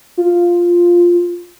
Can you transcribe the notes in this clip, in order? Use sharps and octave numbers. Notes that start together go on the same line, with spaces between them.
F4